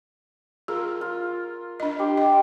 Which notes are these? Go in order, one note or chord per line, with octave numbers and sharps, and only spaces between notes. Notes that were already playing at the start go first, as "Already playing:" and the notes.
F4 G#4 A#4
F4
D4 D#5
G4 C6
D#5